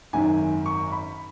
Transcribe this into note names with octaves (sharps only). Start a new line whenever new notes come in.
G#1 F#2 D#3 G#5
C#6
B5